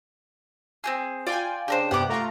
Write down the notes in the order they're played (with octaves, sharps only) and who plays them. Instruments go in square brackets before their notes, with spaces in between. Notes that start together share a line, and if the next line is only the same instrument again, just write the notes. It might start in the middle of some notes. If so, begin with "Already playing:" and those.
[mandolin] C4 G4 G#4
[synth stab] F4 G#5 [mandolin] D5 G5
[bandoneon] C#3 D4 [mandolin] G4 A#4 C5
[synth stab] G2 C3 [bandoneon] B3 G4 [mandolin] F#5 D6
[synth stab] A3 F4 [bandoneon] A#5